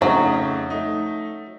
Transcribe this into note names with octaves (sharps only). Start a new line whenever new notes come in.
F2 C#3 F#3 A3 D#4
A3 D#4